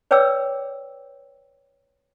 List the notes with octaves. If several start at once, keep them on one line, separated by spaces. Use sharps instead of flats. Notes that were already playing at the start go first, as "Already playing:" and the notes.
B4 C#5 D5 G5 D6 E6